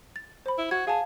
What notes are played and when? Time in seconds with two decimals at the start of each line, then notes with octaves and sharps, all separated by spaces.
0.16 A6
0.46 C5 B5
0.58 E4
0.71 F#4 G#6
0.87 G#4 F5 G#5 A5